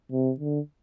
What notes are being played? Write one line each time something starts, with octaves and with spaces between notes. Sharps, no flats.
C3
D3